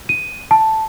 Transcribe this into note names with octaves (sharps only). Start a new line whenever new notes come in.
D#7
A5